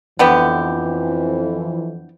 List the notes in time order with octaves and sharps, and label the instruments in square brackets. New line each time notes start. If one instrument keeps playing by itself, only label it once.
[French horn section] F2 E3 [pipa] D3 B3 G4